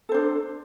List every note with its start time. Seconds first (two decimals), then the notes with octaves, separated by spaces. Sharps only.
0.09 A4
0.12 C5
0.14 D4